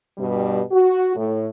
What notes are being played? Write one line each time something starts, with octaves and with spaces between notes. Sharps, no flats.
G2 B2 G3
F#4
A2